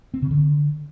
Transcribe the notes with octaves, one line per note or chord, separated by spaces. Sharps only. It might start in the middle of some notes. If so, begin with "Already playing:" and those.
C4
C#3
D3